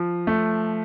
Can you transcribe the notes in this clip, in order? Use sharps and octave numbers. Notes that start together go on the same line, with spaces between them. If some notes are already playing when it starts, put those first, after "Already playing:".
Already playing: F3
A3